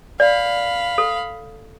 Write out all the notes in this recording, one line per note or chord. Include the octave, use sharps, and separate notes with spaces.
D5 F5 B5
A4